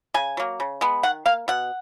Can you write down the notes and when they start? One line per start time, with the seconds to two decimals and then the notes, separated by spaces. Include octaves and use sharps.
0.14 C#3 G#5
0.37 F#3 A#3
0.60 C#3
0.81 G#3 B3
1.03 D#3 F#5
1.26 A#3 F5
1.48 B2 F#5